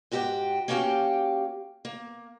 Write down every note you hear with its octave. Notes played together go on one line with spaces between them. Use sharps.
G#2 F#4 G4 B4 G5
A#3 C#4 F#4 G4 F5 G5
A#3